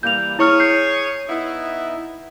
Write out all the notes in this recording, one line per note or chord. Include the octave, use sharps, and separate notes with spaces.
E3 G3 A#3 G6 F7
E4 G#4 C#5 C#6 F6
G6 C7
B3 D#4 E4